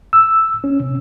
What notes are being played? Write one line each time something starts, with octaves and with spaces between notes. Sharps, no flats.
E6
C#4
C3